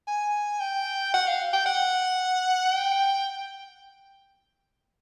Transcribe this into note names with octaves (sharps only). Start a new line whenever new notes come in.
G#5
G5
F#5
F5
G5
F#5
G5